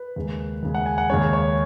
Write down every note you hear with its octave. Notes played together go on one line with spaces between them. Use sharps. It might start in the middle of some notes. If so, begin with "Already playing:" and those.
Already playing: B4
D#2 C#3 G#3
D#2 C#3 G#3
F#5
G#5
F#5
D#2 C#3 G#3 C#5
C#5